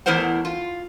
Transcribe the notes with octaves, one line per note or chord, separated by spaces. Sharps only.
E2 A2 E4 A#4 C5 F#5
F4